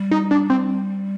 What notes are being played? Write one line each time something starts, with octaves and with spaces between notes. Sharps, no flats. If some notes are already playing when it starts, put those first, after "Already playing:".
Already playing: G3
D#4
D4
C4